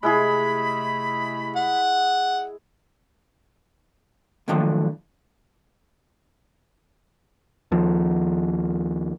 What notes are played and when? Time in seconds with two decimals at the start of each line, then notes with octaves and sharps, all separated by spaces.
0.03 C3 G#3 A3 E4 G#4 B5
1.55 F#5
4.48 D#2 A2 D3 D#3 F3 F#3
7.72 D#2 F3